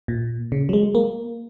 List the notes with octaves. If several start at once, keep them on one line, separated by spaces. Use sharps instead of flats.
A#2
C#3
F#3
G#3
A#3